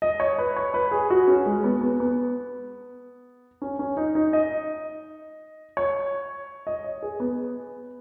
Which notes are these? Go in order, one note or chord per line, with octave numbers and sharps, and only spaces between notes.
D#5
C#5
B4
C#5
B4
G#4
F#4
C#4
G#3
B3
B3
B3
C#4
C#4
D#4
D#4
D#5
C#5
D#5
C#5
G#4
B3